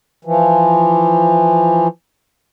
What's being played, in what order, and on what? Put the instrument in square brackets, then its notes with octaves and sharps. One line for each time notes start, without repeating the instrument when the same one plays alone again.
[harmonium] E3 F3